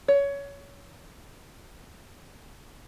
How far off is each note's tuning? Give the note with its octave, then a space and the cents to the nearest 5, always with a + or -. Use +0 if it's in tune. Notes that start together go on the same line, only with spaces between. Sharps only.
C#5 +20